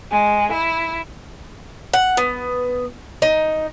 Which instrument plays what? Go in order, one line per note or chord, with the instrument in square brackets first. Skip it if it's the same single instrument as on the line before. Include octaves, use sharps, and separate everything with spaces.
[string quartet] G#3
E4
[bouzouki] F#5
B3
D#4